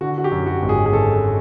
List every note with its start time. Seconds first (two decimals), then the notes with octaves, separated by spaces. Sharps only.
0.01 D3 F#4
0.18 F#4
0.24 G4
0.31 F#2
0.46 F#4
0.62 G#1
0.69 G#4
0.86 G#4
0.92 G#1 A4